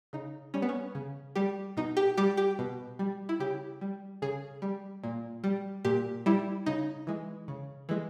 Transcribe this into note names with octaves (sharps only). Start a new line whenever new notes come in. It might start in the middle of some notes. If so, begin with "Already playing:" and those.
C#3 D#4
G3 C#4
B3
C#4
C#3
G3 G4
B2 D#4
G4
G3 G4
G4
B2
G3
E4
C#3 G4
G3
C#3 G#4
G3
A#2
G3
A#2 G4
G3 E4
C#3 D#4
E3 G#3
C#3
E3 G#3